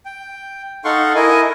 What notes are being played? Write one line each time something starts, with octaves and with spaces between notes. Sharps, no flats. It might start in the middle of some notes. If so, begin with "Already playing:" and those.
G5
D#4 A4 F5 F#5 C6 C#6
E4 A#4 D#5 G#5